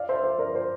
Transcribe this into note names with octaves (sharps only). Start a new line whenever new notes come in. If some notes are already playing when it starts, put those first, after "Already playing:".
Already playing: D5 F5
C5 E5
C5 E5
A#4 D5
C5